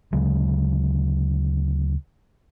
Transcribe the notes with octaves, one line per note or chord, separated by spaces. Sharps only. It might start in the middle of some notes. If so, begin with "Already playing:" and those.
D2 C#3 F#3 G#3